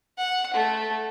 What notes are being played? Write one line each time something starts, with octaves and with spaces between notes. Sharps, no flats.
F#5
A3